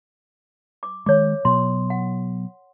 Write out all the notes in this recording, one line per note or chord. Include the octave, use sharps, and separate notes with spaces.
D6
D#3 G#3 C#5 D6
B2 F#3 B3 C6
F#5